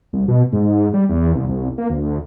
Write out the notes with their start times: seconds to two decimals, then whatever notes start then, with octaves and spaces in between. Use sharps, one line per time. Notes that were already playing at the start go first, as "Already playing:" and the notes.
0.13 C2
0.28 B2
0.53 G#2
0.94 G3
1.09 E2
1.35 C2
1.49 C2
1.78 A#3
1.90 D2